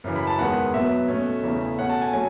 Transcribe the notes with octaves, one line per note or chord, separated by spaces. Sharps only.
F#2 C#3 E3
B5
A5
E2 D#3 G#3 B3 F#5
B2 F#3 B3 E5
B2 A3 C#4
E2 C#3 E3 A3
B2 A3 C#4 F#5
A5
G#5
F#3 A3 C#4 G#5